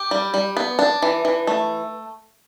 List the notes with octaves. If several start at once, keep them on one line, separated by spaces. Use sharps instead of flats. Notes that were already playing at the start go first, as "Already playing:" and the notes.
Already playing: G4
G3
G3
B3
D4
E3
E3
A3